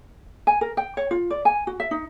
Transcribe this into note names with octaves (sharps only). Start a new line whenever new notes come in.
G#5
A#4
G5
C#5
F4
D5
G#5
F#4
E5
D#4